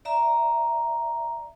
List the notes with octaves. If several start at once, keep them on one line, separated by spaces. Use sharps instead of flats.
D5 E5 A#5